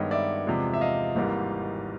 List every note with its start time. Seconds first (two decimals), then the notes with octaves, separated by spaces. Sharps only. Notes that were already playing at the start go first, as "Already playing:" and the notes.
Already playing: G2 D#3 G#3 B3 C#5 D#5
0.11 D5 E5
0.47 E2 C3 F3 G#3
0.73 E5
0.81 D#5 F5
1.15 G#1 G#2 E3 G3 A#3